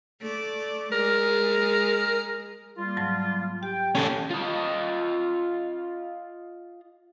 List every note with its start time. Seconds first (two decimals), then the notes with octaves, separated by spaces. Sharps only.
0.21 A3 D5
0.92 G#3 A#4
2.78 G3 A#3 F4
2.97 G#2 F#3 A5
3.63 G4 G5
3.95 C#4 A4
4.31 F4 D#5